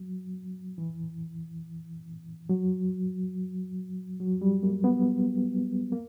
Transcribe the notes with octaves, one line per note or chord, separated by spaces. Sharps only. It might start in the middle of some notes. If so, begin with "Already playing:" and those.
Already playing: F#3
E3
F#3
F#3
G3
A#3
B3
A#3